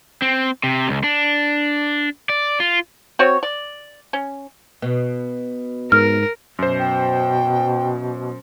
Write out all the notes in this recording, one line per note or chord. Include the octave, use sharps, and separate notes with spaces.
C4
C3
C#2
D4
D5
F4
C4 F#4 C#5
D5
C#4
B2
G#2 A#4 F6
F#2 B2 C5
G5